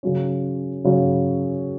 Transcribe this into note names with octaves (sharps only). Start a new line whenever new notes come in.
C#3 F#3 C#4
C#3 F#3 C#4